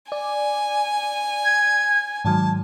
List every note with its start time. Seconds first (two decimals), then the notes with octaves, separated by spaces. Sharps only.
0.12 D5 G#5
1.45 G#6
2.25 G#2 D#3 F#3 A5